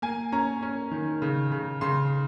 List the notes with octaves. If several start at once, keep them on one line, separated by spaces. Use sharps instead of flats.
A#3 G#5
C#4 A#5
C#4
D#3
C#3
C#3
C#3 C6